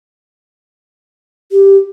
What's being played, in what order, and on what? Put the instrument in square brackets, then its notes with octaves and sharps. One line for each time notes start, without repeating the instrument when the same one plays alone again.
[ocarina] G4